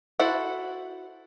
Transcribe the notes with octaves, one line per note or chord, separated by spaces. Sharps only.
E4 F#4 A4 C5 F#5